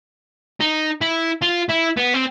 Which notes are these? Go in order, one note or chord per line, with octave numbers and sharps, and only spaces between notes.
D#4
E4
F4
E4
B3
C4